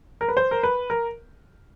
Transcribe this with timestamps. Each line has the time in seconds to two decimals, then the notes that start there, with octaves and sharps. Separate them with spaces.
0.21 A#4
0.28 B4
0.37 C5
0.51 A#4
0.63 B4
0.90 A#4